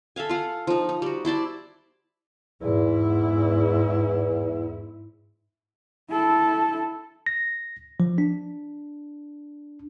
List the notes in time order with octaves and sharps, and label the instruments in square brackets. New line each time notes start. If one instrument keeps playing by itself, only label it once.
[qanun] A4 E5 F5 G#5
F4 F5 F#5
F3 D#4
D#4
G3 F#4
E4 C5 D5 A5
[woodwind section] E2 [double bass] G#2 E4
[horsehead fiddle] E4 A4
[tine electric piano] A#6
F3
D4